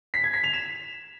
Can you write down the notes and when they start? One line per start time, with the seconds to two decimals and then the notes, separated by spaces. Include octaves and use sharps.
0.14 B6
0.24 G#6
0.34 B6
0.44 F7
0.54 E7